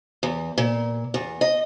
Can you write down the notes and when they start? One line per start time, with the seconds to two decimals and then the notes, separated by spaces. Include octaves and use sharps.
0.23 E2
0.58 A#2
1.14 E2
1.41 D#5